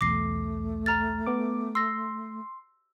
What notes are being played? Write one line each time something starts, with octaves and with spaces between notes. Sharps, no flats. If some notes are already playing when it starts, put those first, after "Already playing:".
B1 E2 A3 D6 A#6 C7
A#5 F6 A6
B3 D6
C6 E6 A#6